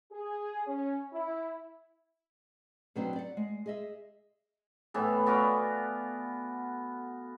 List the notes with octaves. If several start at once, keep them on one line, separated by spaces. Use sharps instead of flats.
G#4
C#4
E4
B2 F#3 B3 C4 D4
D5 F#5
G#3
G#4 D#5 E5
A2 E3 B3
B3 F#4 D5 F5